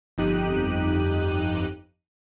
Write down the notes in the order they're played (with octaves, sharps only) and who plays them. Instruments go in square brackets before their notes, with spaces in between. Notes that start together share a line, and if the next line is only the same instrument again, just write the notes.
[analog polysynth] G1 F2 D#4 G4 F#6 D#7